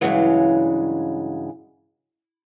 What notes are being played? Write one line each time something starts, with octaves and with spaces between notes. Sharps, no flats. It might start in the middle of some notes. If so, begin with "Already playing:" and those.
G2 A#2 C#3 E3 F#3 G#3